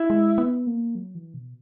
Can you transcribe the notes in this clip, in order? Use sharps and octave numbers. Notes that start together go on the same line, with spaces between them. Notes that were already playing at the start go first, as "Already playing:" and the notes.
Already playing: E4
G#3
B3
A#3
F#3
E3
B2